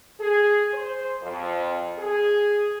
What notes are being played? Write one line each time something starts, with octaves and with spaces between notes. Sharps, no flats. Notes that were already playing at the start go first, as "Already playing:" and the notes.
G#4
C5
F2
G#4